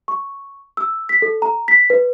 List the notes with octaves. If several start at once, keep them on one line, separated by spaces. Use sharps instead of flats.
C#6
E6
B6
A4
A#5
B6
B4